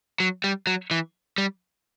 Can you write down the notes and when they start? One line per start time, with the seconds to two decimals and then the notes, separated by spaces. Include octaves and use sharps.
0.20 F#3
0.44 G3
0.67 F#3
0.91 E3
1.38 G3